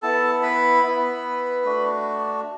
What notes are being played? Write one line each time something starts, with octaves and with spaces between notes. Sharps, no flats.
B3 E4 A4 A5
B4 B5
B3 E4
A3 D4 F#4